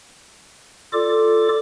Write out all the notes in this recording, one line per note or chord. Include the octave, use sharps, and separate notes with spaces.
F4 A4 D5 D6